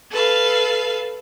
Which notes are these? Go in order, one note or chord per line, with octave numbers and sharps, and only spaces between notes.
A4 B4 F5